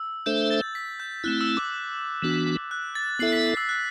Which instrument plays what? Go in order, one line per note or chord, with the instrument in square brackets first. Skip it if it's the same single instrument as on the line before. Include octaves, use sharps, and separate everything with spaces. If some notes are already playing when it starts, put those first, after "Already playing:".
Already playing: [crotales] E6
[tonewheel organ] A3 D4 A4 C5 E5 [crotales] G6
[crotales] A6
B6
G6
[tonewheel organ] A3 C4 E4 [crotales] F#6
[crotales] E6
D6
[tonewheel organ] E3 B3 D4 F#4
[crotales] F#6
A6
[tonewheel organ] B3 E4 A4 E5 [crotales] C7
[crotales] B6
E6
F#6